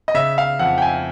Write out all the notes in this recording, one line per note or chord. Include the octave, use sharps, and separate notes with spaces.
D#5
C#3 E5
F5
F2 F#5
G5
G#5